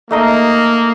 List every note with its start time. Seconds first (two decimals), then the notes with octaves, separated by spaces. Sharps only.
0.11 A3 A#3 D#4 D#5